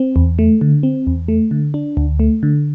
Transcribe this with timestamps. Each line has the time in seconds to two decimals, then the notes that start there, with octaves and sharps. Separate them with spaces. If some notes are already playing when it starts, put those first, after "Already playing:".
Already playing: C4
0.16 E2
0.39 A3
0.61 D3
0.83 C4
1.07 E2
1.28 A3
1.51 D3
1.74 D4
1.97 D2
2.20 A3
2.43 D3